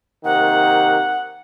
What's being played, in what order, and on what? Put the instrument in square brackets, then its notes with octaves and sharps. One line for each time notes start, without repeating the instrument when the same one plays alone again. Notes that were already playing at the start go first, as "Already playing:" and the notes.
[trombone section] C3 D#3 A#3 [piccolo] F#5